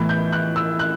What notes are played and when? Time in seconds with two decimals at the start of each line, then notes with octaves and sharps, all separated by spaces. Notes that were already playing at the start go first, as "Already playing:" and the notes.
Already playing: A2 E3 B3 E4
0.09 G6
0.32 F#6
0.56 E6
0.79 F#6